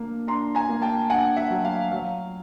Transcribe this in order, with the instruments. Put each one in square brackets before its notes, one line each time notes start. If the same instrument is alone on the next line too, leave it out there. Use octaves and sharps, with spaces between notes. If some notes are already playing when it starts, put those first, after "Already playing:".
Already playing: [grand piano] D3 A#3 D4
D4 A#5 C6
G#5 A#5
A#3
G5 A5
D4 F#5 G#5
E5 F#5
F#3
F5
F#3 F5